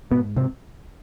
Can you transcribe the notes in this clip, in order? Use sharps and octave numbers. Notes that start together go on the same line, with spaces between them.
G#2 B2 B3
C3 C4